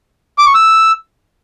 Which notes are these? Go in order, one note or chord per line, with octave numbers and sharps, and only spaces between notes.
D6
C#6
E6